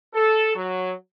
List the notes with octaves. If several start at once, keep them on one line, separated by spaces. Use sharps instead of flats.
A4
F#3